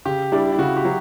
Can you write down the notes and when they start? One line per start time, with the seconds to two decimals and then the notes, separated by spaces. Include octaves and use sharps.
0.05 C#3 G4
0.32 G3 D4 E4
0.52 E4
0.58 C#3 F#4
0.77 G4
0.85 F#3